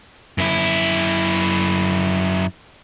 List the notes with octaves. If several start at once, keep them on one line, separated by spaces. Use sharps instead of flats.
F#2 E4